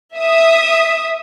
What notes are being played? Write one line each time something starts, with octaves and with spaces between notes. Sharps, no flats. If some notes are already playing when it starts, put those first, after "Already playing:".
E5 D#6